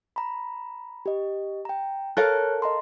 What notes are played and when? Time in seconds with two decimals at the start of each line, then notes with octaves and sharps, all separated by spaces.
0.16 A#5 B5
1.06 G4 D#5
1.65 G5 A#5
2.17 A4 A#4 C#5 F5 F#6
2.62 D#5 A#5 C6